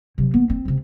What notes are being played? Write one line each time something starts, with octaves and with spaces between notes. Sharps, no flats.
C3 F#3
B3
C4
C#2 C3